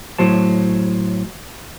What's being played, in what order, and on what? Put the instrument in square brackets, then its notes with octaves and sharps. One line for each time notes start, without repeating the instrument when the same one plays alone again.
[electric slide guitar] A2 F#3 C5 A5